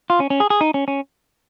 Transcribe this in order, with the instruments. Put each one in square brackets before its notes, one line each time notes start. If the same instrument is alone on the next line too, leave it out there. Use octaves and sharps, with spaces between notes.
[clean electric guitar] F4
C#4
C#4
G#4
G#4
D#4
C#4
C#4